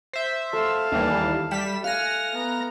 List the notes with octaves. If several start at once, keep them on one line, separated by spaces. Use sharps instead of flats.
C5 E5
A3 F5 A5
D#2 E3 G3
G3 B6 E7
F5 F#5 G#5 F6 A#6
B3 A#5